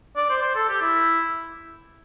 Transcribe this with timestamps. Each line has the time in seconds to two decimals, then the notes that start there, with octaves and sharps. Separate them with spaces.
0.17 D5
0.30 C5
0.42 C5
0.56 A4
0.69 G4
0.82 E4